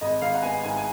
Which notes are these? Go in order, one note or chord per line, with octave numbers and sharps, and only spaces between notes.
G#1 D#5
G#1 F5
F#5
B3 G#5
G#2 G#5
G#5